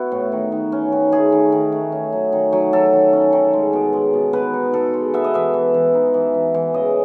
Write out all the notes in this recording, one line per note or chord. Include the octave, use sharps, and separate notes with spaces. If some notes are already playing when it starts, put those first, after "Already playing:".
Already playing: B3 E4 F#4
A2
D#3
D#3
C#4
D#3
A3 G#4
D#3
D#3
A3
C#4
F#3
D#3
F#3
F#3 A4
D#3
C#4
D#3
G#3
B2
G#3
B2
B2 B4
D#4
B2 A4
G#3
B3 E5
D#5
E3 E5
E3
E3
D#4
E3
E3
E3
C#3 D#5